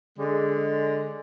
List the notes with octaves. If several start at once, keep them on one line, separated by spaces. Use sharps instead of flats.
D3 G#3